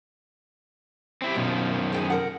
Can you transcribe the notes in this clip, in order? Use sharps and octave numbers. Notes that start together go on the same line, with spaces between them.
C4 E4 G4
F#2 B2 D#3 F3
G#4 G5 G#5
C3 A#4 F#5